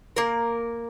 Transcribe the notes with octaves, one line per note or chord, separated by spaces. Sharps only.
A#3 A#4